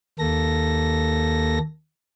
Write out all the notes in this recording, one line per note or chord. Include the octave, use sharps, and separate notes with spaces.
D#2 A#3 A4 A#6